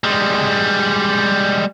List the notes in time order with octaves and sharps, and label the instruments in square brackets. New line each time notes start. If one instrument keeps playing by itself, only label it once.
[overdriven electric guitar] G3 G#3